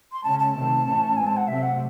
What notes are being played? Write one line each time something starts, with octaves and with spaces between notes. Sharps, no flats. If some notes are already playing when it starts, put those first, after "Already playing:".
C6
C#3 G#3 C#4 A5
A5
C3 D#3 A3 C4
A2 E3 A3 C#4
A2 G#3 C4 G#5
A5
F#5
C3 F#3 A3 C4 E5
F#5